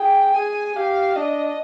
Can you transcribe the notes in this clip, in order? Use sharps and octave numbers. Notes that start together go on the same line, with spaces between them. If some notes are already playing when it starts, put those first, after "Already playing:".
Already playing: G#4 G5
G#4 G#5
G4 F5
D4 D#5